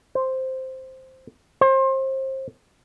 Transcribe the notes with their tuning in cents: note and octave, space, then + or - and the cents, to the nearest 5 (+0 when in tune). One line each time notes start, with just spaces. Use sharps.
C5 +0
C5 +30